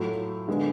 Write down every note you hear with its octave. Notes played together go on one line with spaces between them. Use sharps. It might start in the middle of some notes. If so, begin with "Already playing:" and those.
Already playing: A2 F#3 A3 F4
D3 G#3 B3